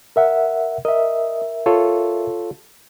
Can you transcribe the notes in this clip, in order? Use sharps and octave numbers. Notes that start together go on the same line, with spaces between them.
A#4 E5 F#5
A#4 D#5 E5
F4 A4 C#5